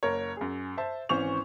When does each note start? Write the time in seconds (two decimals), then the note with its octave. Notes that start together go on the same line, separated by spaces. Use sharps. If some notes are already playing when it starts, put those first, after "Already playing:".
0.03 F#1 A#4 C#5
0.37 F#2 G#4
0.77 C5 E5 A5
1.09 G#1 E3 C#4 C5 C#6 F7